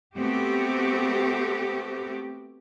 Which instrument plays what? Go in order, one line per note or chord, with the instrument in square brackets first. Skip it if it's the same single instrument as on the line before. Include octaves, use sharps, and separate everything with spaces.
[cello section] A3 B3 C4 F#4 G4